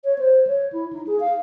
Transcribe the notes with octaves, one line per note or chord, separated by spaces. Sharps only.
C#5
C5
C#5
E4
D#4
G#4
F5